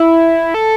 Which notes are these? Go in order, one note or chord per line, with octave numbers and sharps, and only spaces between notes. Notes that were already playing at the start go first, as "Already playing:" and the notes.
Already playing: E4
A4